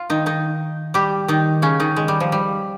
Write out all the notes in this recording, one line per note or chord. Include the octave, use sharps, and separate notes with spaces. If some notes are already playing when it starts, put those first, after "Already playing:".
Already playing: F4
D#3 D#4
D#3 D#4
G3 G4
D#3 D#4
C#3 C#4
D#3 D#4
G#3
G3
F3
G3